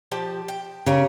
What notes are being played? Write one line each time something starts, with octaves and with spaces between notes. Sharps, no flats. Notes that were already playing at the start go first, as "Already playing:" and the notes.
F3 G4 A5
G5
C#3 G4 A#4 C#5